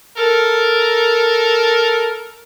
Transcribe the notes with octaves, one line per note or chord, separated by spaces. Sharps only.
A4 A#4